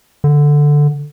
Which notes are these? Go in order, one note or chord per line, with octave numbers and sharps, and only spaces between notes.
D3